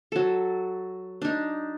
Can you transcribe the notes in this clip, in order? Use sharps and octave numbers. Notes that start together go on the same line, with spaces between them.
F#3 A4
D4 D#4